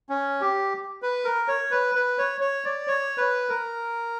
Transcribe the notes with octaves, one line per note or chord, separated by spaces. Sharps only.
C#4
G4
B4
A#4
C#5
B4
B4
C#5
C#5
D5
C#5
B4
A#4